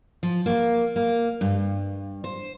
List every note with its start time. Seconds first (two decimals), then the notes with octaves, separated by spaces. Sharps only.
0.23 F3
0.46 A#3
0.96 A#3
1.41 G2
2.24 C5